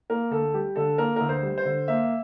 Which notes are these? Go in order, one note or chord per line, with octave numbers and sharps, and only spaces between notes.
A#3 A#4
D2 A4
G3 G4
D3 A4
A#3 A#4
D2 A#4
C5
G3
C5
D3
A#3 E5